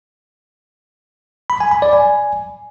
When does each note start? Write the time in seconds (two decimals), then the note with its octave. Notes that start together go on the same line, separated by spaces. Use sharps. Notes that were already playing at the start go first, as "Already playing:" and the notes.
1.50 B5
1.60 G#5
1.71 B5
1.82 D5
1.93 G#5